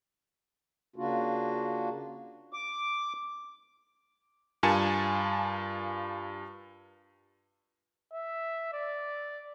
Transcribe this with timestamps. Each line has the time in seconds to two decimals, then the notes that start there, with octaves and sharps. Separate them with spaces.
0.96 C#3 A#3 D4 F4 F#4
2.53 D6
4.63 G2 F4 A#4 G#5 A5 C#7
8.13 E5
8.73 D5